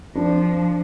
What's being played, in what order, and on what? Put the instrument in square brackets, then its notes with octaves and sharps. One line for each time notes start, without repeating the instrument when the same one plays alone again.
[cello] F3 [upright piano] D4